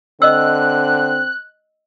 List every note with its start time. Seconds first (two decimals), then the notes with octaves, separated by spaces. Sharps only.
0.22 D3 C4 D#5 E6 F#6